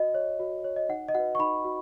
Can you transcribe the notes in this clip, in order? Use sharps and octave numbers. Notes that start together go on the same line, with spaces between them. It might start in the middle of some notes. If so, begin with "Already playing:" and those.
Already playing: F#4 D#5
C#5
F#4
C#5
D#5
D#4 F#5
D#5
F#4 B4 F#5
C#6
D#4 B5
F#4